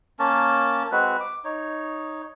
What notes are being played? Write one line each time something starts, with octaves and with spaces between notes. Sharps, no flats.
A#3 C#4 A#4 A5
G#3 C4 F#4 B4
D6
D#4 C#5